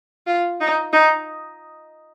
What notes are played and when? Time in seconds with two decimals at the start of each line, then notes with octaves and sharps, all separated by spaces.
0.27 F4
0.60 D#4
0.93 D#4